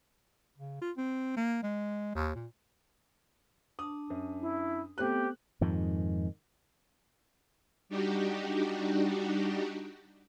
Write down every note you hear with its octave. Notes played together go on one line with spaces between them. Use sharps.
C#3
F4
C4
A#3
G#3
D#2
A#2
D4 A5 D#6
F#2
E4
A3 B3 C4 G4 F#6
F2 G#2 D#3
G3 D4 D#4 F#4 G4